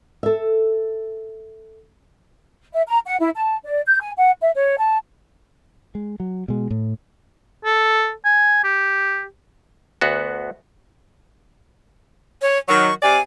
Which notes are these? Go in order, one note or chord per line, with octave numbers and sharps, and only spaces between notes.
A4 E5
E5
A#5
F#5
E4
A5
D5
G6
G#5
F#5
E5
C#5
A5
G#3
F#3
B2 G#3
A2
A4
G#5
G4
D2 B3 F#4
C#5
D#3 F#3 C#6
C3 D5 G#5